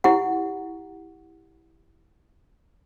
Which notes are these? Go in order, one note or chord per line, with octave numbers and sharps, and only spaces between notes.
E4 G4 F#5